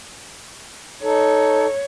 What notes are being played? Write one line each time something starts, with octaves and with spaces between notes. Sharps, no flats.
D#4 A4 C#5